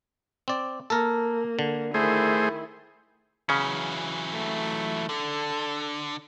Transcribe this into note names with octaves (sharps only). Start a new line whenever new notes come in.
C4 D5
A#3 A4 A#4
D3
D#3 A3 E4 G#4 C5
C#3 E3 F#3 C#4
A3
D3 A4